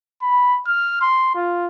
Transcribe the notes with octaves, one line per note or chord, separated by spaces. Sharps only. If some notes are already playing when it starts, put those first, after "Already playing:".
B5
F6
C6
F4